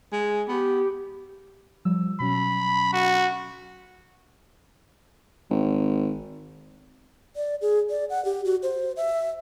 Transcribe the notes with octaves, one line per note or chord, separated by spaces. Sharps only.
G#3
B3 G4
F3 G3 E6
B2 F#3 C#4 B5
F#4
G#1
D5
G#4
D5
F#5
G4
F#4
C5
E5